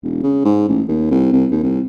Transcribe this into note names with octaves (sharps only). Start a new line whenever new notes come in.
E1
C#3
G#2
A1
D#2
C2
C2
D#2
C2